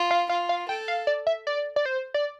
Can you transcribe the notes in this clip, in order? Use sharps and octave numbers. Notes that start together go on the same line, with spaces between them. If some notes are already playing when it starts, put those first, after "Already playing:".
Already playing: F4
F5
F4 F5
F5
A4 G5
F5
D5
E5
D5
D5
C5
D5